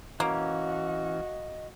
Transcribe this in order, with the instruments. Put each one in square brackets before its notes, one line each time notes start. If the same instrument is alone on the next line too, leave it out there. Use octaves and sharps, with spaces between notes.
[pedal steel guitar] E3 C#4 [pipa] A#3 [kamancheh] F#4 [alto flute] D#5